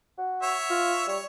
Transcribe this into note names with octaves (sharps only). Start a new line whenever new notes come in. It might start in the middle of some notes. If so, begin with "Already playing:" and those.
F#4
C#5 E5
F4
G3 C#5